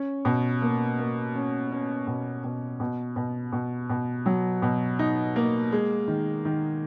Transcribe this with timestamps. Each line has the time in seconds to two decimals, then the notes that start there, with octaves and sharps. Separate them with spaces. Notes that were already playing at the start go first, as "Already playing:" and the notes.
Already playing: C#4
0.25 B2
0.62 A#3
0.98 A#3
1.35 C#4
1.72 C#4
2.07 B2
2.44 B2
2.80 B2
3.16 B2
3.52 B2
3.90 B2
4.26 F#3
4.62 B2
4.99 D#4
5.36 A#3
5.72 G#3
6.08 D#3
6.45 D#3